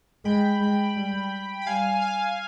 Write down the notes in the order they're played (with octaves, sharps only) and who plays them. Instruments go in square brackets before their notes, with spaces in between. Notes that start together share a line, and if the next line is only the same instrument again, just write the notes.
[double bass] G#3 [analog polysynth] G5 B5
[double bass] G#3
G3
[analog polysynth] B5
[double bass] G3 [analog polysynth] F5 G#5
[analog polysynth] F5 G#5